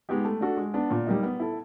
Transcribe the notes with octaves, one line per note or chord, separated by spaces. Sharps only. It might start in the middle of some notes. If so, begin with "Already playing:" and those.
G#3 B3 D#4 G4
A3
D4 F#4 A4
G#3
B3 D4
A#2
G3 A#3 D#4
B3
E4 A4